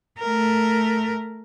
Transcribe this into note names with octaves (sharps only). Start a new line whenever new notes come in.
A3 A#4